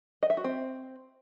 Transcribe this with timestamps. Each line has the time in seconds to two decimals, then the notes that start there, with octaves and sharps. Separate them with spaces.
0.23 D#5
0.30 E5
0.37 F#4
0.44 C4